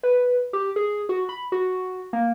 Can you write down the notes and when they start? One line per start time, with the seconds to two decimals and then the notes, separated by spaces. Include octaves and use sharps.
0.03 B4
0.53 G4
0.76 G#4
1.09 F#4
1.29 B5
1.52 F#4
2.13 A#3